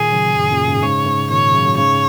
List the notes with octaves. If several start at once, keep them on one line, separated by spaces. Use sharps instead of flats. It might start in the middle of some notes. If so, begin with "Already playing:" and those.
Already playing: A#2 D#3 G#4
C#3 F#3
F#2
F#2 A#2
G#2 C#3
G#2 C#3 C#5
G#2 C#3
A#2 D#3 C#5
C#3 F#3
C#3 F#3
A#2
G#2 C#3 C#5